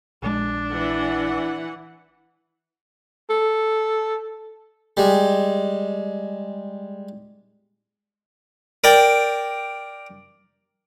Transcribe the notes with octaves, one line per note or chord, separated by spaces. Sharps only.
A#1 G#3 D4
E3 F#5
A4
G3 G#3
A#4 D5 G5